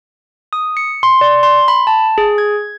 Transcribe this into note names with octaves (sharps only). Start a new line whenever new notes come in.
D#6
C#7
C6
D5
C6
B5
A5
G#4
G#6